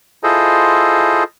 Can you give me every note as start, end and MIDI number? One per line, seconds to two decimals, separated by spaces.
0.23 1.24 64
0.23 1.24 65
0.23 1.24 68
0.23 1.24 69
0.23 1.24 72
0.23 1.24 75